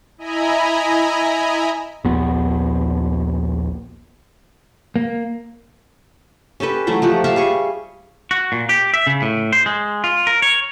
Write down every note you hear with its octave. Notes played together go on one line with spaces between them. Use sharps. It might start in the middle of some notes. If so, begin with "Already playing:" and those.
E4 D#5 G#5 A#5 B5
A#1 D#2 B3
A#3
C#4 G4 A4 B4
E3 F#3 A3 C5
F3 G4 F#5
E5 F5 A5 A#5
G3 G#4 C#6
F#4
A#2
G4
E5
C#3
A2
C5
G#3
F4
A#4
C#5